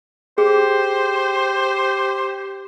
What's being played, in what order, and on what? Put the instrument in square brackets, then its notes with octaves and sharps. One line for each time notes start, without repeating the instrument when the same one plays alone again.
[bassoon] G4 [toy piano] G#4 [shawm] C5